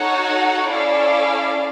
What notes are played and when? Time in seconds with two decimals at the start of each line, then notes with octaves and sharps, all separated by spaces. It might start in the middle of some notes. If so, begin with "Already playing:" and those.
Already playing: D#4 F#4 A4 C#5 F#5
0.68 C#4 E4 A4 D5 F5